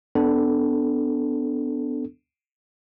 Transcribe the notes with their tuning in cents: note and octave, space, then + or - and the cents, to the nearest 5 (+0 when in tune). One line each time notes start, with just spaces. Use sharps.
B3 +25 D4 +0 A4 +5